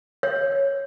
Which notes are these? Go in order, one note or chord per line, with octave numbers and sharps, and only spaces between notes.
C#5